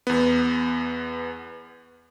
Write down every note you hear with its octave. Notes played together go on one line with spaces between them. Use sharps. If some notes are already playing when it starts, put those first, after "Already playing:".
E2 B3